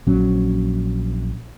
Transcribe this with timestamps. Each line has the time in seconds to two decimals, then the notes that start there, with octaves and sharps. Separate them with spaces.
0.07 A#1 F#3 C#4